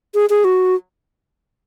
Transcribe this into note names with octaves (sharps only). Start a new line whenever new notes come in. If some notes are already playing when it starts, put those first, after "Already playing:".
G#4
G#4
F#4